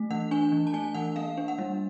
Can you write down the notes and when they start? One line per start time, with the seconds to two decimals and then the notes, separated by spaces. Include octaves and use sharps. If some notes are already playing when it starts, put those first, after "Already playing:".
Already playing: A3
0.11 E3 F#5
0.31 D4 G#5
0.52 E3
0.67 A5
0.73 A3 G#5
0.95 E3 F#5
1.16 A#3 F5
1.37 D4
1.48 F#5
1.58 G3